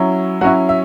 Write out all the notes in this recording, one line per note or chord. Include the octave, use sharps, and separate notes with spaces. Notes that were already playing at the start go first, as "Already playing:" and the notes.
Already playing: F#3 C#4 E4
F#3 C#4 E4 F#4
E5